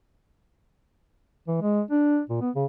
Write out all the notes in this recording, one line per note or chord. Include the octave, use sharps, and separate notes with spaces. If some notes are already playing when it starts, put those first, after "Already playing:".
E3
G#3
D4
A#2
B3
C#3